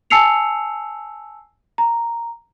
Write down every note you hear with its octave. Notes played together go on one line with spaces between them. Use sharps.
G#5 A5 E6 C7 C#7 F7
A#5